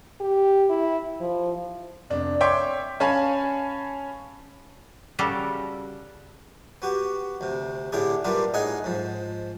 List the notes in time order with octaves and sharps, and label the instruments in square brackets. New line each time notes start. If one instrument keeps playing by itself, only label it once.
[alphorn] G4
E4
F3
[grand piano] F1 D4
C#5 E5 G5 C6 D6 G6
C#4 C#5 F5 G#5 A5 B5
[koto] C#3 G3 F#4 G4 A4 A#4
[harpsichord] B3 F#4 G4
D2 C3
A2 D3 D4 E4 G4 G#4
G3 A#3 B3 D4 F4 G4
A2 D#4 G#4 D#5 F#5 G#5
G#2 F3